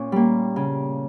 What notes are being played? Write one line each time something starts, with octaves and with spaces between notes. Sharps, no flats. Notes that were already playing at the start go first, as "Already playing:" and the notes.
Already playing: A#2 C#4
G3 A#3
C#3